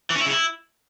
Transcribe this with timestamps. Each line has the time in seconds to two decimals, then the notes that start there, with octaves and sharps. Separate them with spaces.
0.10 E3
0.15 C#4
0.21 E4
0.26 C#3
0.31 E4